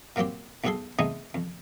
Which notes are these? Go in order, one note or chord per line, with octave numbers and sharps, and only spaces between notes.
A#2 F#3 A#3 C4 G4
B1 G#2 F#4 G#4 A4 C6
A3 B3 C4 D#4 G#4 D#5
F2